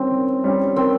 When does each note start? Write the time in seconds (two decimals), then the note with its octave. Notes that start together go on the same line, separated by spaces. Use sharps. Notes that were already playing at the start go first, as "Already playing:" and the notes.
Already playing: D#3 G3 C4 C#4 G4
0.11 D#3
0.44 G3 C#4 G4
0.76 D#3 C4